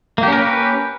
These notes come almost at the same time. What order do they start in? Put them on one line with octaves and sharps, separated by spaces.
A#3 G4 C#4 A#4 B4